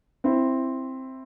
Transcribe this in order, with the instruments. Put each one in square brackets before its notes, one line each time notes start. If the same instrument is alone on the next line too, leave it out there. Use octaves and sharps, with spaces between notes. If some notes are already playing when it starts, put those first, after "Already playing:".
[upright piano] C4 E4